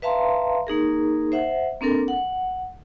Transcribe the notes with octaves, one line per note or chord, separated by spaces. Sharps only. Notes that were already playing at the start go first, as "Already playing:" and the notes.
B4 E5 F5 A5 A#5 C6
A#3 D#4 G#4 A#4
C5 E5 F#5
A#3 C4 D4 A4 A#4
F#5